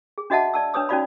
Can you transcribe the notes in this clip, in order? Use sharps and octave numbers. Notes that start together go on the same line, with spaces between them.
G#4
D4 F#4 D#5 E5 F#5 A5
D5 A5 E6
D4 B4 C#5 D#6 E6
C#4 D#4 F#4 D5 F5 B5